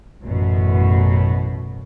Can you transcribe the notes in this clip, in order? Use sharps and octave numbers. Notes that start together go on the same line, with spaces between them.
A1 F#2 B2